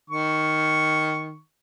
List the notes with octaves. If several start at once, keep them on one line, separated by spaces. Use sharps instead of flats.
D#3 C#6